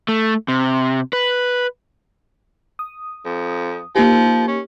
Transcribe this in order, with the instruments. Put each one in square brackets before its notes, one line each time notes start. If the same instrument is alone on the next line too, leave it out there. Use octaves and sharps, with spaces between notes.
[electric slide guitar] A3
C3
B4
[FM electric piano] D#6
[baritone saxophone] F2
[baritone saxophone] F3 [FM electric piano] A#3 D#4 G4
[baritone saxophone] C#4